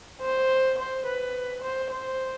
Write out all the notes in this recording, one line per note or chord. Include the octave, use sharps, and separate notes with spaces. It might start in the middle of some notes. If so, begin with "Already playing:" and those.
C5
C5
B4
C5
C5